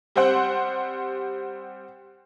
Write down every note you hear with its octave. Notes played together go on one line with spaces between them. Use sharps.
G3 C4 C5 F#5